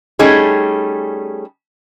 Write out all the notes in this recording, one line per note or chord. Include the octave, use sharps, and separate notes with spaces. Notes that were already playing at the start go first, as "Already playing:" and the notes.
G3 A3 C#4 D#4 G#4